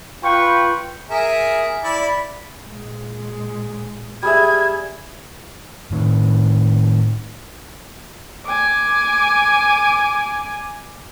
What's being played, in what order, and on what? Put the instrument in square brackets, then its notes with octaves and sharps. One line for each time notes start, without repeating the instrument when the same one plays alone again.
[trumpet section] F4 B4 G5 C#6
[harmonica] G#4 A#4 E5
E4 D5 B5
[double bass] A#2 G#3
[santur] G3 G#4 E5 [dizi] G#6
[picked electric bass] A2 D#3
[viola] G#5 D6